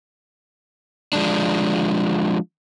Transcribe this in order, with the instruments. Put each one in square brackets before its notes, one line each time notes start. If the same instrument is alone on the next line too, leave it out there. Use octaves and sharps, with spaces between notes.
[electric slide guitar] F3 G#3 D4